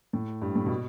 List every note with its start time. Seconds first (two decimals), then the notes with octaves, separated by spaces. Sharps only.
0.13 A2
0.42 G2
0.55 A2
0.66 B2